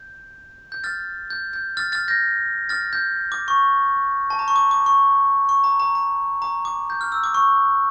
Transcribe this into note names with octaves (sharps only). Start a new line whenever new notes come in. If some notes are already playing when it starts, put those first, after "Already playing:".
Already playing: G6
G6
F6 A6
G6
G6
F6 A6
F6 A6
G6 A#6
F6 A6
G6
D6
C#6
A5
A#5
C#6
D6
D6
C#6
C#6
A#5
A#5
A#5
A#5
D6
G6
F6
E6
D6
C#6